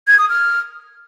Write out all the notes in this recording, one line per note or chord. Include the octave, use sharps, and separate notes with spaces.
G#6
D#6
F6